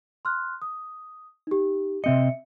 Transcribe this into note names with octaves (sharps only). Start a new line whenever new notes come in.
C6 F6 F#6
D#6
D#4 G4
C3 C4 D#5 E5 C#7